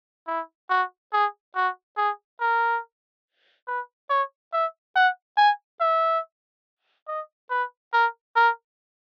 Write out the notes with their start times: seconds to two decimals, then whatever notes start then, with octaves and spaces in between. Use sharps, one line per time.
0.27 E4
0.70 F#4
1.13 G#4
1.55 F#4
1.97 G#4
2.41 A#4
3.68 B4
4.10 C#5
4.53 E5
4.96 F#5
5.37 G#5
5.81 E5
7.07 D#5
7.50 B4
7.93 A#4
8.36 A#4